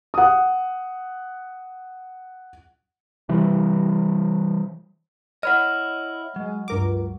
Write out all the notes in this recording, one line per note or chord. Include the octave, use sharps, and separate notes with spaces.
F#5 D#6
C3 E3 G3
E4 C#5 D#5 F#5 B5 F6
F#3 G#3
C#2 G2 A#4 D6